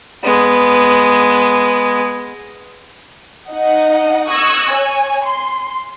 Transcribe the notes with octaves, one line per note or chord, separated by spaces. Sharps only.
G#3 B3
D#4 D#5 F#5
C#6 D#6 E6 F#6 G#6 A#6
C#5 G#5
C6